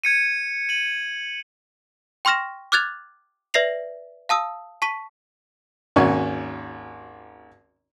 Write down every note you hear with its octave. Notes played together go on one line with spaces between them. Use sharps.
G#6 C#7 D#7
D#7 F#7
G5 C6 C#6 F6 A#6 E7
D6 F6 F#6 G#6 A6 F7
B4 D5 E5 A#6 C7 F7
F5 A5 D#6 E6
A5 C#6 B6 D#7
G#1 D#2 C#4 F#4 G#5 C#6